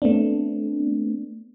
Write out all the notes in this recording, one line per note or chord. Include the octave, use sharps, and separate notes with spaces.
A3 B3 C4 D4